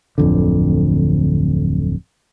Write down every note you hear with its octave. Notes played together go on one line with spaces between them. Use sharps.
D1 F2 D3